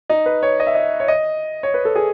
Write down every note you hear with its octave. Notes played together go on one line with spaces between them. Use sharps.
D#4
B4
C#5
D#5
E5
D#5
C#5
D#5
C#5
B4
A4
G#4